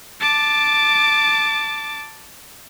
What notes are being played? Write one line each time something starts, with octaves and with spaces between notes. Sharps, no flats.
A5 D6